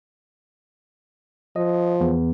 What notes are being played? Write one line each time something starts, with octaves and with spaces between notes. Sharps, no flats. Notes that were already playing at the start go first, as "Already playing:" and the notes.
F3 D#5
E2 B3